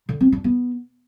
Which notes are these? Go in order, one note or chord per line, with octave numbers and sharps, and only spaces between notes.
D3
C4
D4
B3